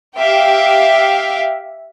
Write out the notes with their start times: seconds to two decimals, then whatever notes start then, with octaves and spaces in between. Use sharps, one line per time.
0.17 G4 E5 F5 G5